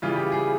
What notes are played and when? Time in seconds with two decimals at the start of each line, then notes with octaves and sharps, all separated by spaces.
0.02 C#3 E3 G3 F4
0.16 G4
0.32 G#4